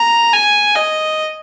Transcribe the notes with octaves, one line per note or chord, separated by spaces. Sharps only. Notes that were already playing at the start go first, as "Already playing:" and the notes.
Already playing: A#5
G#5
D#5